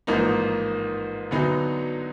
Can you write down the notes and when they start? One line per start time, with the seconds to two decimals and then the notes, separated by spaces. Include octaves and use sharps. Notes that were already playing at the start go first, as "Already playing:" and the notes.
0.07 A1 G#2 F3 A#3 D#4
1.31 D2 D3 F#3 B3 D#4